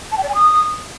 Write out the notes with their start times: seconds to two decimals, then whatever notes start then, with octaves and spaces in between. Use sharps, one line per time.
0.12 A5
0.17 G5
0.23 D5
0.29 G#5
0.35 D#6